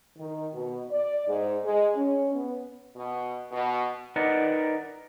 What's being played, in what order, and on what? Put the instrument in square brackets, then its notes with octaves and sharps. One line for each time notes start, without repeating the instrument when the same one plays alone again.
[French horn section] D#3
B2
D5
G#2
G#3
C#4
B3
B2
B2
[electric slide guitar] D#4 A#4 B4 D5 D#5 F#5